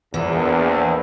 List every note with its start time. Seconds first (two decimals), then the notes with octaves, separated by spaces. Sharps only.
0.14 A#1 E2 E3